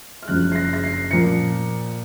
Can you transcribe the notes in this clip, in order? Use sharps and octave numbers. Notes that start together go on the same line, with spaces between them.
F6
F#1 F#2 C#3 F3 F#6
C7
A#6
A#6
C7
A#2 F3 C#7